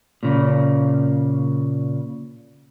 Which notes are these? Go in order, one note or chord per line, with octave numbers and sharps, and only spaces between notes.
A#2 C#3